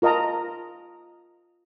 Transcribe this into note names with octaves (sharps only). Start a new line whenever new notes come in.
F4 A#4 D#5 A5 A#5